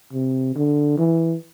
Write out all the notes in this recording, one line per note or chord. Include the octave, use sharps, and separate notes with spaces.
C3
D3
E3